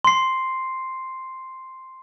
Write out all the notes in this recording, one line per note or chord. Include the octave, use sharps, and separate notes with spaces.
C6 C7